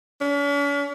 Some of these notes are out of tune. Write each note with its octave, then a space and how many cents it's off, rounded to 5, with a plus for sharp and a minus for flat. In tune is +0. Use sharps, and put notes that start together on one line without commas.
C#4 +45